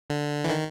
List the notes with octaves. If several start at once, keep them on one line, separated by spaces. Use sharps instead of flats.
D3
E3
D#3